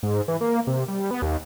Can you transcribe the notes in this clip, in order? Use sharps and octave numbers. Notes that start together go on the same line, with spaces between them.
G#2
E3
A#3
C3
G3
B3
D#2